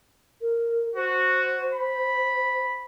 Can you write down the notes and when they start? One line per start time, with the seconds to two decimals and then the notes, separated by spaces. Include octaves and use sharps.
0.41 A#4
0.95 F#4 C5
1.73 B5